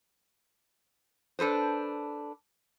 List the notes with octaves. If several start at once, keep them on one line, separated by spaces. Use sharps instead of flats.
D4 A4 B4 C5